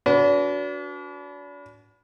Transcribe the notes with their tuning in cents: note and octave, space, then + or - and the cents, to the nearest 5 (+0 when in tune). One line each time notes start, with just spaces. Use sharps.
D4 -40 F#4 -10 B4 +0